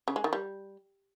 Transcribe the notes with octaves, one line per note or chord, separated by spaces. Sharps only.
C#3
G#3
D#3
G3